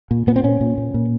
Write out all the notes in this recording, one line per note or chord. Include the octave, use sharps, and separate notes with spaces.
A#2
A#2 B3
C4
A#2 C#4
A#2
A#2
A#2